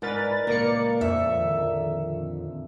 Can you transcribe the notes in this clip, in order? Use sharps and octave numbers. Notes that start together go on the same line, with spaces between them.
G#2 A#4 B4 D5 A6
C#2 A#2 C#3 A#3 A#4 D5 C#7
F2 E5
D3 D#3